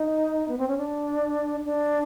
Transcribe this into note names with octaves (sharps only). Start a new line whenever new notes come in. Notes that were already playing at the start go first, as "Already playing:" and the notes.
Already playing: D#4
B3
C4
C#4
D4
D4